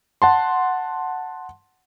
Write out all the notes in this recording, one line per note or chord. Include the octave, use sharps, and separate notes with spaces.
F#5 A5 C6